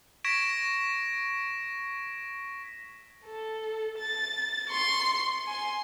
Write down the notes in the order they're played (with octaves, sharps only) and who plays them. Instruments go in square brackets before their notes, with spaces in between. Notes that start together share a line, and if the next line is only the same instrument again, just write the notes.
[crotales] C#6 G#6 A#6 B6 D7 E7
[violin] A4
A6
C6 C#6
G#5 C6